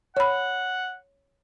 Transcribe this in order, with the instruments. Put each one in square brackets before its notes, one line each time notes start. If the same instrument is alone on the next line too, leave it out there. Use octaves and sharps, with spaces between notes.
[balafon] C#5 B5 [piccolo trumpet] F#5